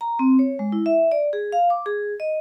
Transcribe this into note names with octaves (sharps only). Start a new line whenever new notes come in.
A#5
C4
C#5
G#3
E4
E5
D5
G#4
F5
D6
G#4
D#5